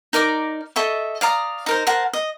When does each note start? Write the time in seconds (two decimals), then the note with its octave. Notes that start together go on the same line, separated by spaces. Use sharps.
0.13 D#4 A#4 D5 D6
0.76 A4 D#5 E5 C#6
1.21 D5 F5 A#5 D#6
1.66 D#4 A#4 C5
1.87 A#4 C5 F#5 A5
2.13 D#5